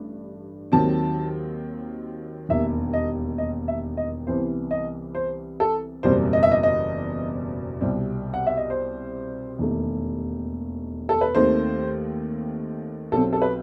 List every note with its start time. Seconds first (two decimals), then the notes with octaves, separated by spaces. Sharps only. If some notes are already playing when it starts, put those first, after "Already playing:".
Already playing: A1 G2 A3
0.72 D#2 D#3 F#3 C4 A5
2.49 E1 D#2 D#3 E5
2.93 D#5
3.38 D#5
3.68 E5
3.97 D#5
4.27 C2 C3 E3 B3 C5
4.71 D#5
5.15 C5
5.60 A4
6.03 F#1 E2 B2 G3 C4 C5
6.33 D#5
6.43 E5
6.51 D#5
6.63 D#5
7.81 C2 B2 G3 C4
8.34 F#5
8.47 E5
8.57 D#5
8.70 C5
9.59 E1 D#2 D#3 A3
11.09 A4
11.21 B4
11.35 D#2 D#3 A3 C4 C5
13.12 B1 B2 F#3 C4 A4
13.33 A4
13.42 B4